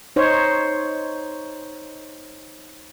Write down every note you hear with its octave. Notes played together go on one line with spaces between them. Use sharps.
D#4 C5 C#5